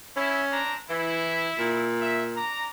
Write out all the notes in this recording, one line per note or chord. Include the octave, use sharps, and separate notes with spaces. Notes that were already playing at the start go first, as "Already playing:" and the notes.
C#4 E4
C4 D4 A#5
E3 E4
A#2
E5
D4 A#5